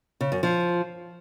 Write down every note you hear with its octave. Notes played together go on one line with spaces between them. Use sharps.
C#3
F#2
F3